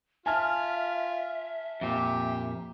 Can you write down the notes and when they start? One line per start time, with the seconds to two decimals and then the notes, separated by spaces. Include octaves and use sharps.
0.26 F4 E5 G#5 A5 F6
1.81 F2 A#2 G4